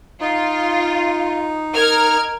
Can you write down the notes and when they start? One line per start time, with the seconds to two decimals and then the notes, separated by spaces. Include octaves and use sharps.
0.21 D#4 F4
1.75 A#4 F6 G#6